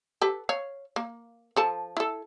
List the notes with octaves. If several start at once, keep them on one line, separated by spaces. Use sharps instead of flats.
G4 A4 B4
C#5 F5
A#3
F3 A4 A5
E4 A4